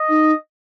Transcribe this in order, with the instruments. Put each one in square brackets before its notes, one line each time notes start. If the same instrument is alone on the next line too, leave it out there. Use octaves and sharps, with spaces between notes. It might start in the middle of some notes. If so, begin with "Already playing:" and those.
Already playing: [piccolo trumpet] D#5
[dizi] D#4